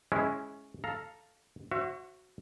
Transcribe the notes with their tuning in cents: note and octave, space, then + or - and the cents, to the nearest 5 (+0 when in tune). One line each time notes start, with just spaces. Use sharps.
G#3 +15 C#4 -5 E4 +0
A4 +0 F5 +0 A#5 +0
F#4 +0 C5 +40 E5 +35